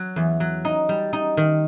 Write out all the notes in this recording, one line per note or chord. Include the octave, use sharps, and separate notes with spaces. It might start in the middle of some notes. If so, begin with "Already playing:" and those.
Already playing: F#3
E2
F#3
D#4
G3
D#4
D#3